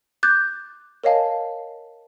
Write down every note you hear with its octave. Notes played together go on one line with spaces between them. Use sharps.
D6 F#6 G6 A6
A#4 C#5 D#5 F5 G#5 A5